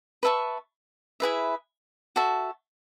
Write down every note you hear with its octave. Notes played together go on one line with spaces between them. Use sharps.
B4 E5 A5 C#6
E4 G#4 B4 E5
F#4 A4 E5 A5